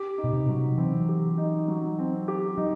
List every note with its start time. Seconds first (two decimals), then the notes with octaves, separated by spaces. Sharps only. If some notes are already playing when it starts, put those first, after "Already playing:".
Already playing: G4
0.18 D#4
0.24 B2
0.33 C3
0.49 F#3
0.78 E3 C4
1.09 G4
1.38 D#4
1.68 F#3
1.99 C4
2.28 G4
2.57 F#3 D#4